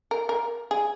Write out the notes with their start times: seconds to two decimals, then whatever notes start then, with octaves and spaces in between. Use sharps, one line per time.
0.11 A#4
0.29 A#4
0.71 G#4